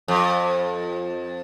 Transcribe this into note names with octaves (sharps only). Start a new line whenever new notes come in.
F2